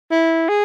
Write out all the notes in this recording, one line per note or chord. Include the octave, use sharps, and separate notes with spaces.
E4
G#4